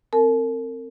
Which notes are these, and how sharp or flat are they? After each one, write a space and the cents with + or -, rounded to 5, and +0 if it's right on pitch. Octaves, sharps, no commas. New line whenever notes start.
C4 +0 A#4 -35 A5 -45